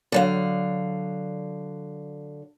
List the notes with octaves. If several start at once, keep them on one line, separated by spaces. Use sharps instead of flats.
D3 F#3 F5